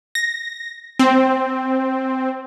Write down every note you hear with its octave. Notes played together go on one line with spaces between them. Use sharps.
A#6
C4